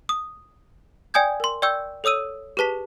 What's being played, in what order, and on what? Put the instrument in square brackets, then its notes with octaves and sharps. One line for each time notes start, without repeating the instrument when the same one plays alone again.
[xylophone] D#6
D5 G5 G#5 D#6 G6 G#6
A#4 C6
D5 G5 C#6 E6 G6
A4 C#5 D#6 E6 D#7
G4 G#4 B4 A5 B6